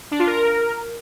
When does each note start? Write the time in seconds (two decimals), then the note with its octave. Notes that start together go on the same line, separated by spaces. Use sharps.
0.11 D4
0.19 F4
0.27 A#4